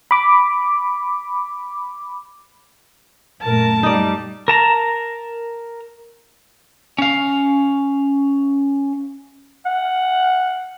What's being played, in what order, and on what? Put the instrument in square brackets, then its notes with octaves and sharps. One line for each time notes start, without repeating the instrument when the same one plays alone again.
[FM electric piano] B5 D6
[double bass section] F#2 A#2 A3 [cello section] A#4 [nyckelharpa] A5
[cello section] G3 [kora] D#4 D5
[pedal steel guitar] A#4 A5 A#5
[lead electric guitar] C#4 F5
[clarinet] F#5